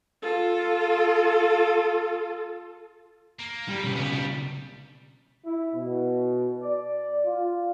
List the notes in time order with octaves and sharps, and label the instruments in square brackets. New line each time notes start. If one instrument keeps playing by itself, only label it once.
[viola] F4 A4
[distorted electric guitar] A#3
[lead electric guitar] G3
[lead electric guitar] B1 C#3 [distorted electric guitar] B4 G5
[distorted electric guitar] B3
G3
[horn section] E4
B2
D5
F4